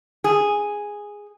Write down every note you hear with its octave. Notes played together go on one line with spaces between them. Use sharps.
G#4